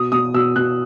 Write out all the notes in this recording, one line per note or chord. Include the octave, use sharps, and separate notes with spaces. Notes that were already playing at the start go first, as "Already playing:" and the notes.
Already playing: B2 D#6
B2 D#6
B2 E6
B2 F#6